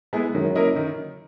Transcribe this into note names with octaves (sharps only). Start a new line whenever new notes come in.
G#3 B3 E4 G#4
F#2 D#3
A#3 E4 A#4 D#5
D#3